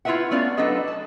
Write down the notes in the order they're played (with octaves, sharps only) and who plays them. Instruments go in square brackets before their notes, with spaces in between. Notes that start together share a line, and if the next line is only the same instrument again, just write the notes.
[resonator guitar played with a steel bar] E4 F4 G#4 B4 E5 F#5
A3 B3 C#4 D5 F5
F#3 D4 A4 B4 D#5
A5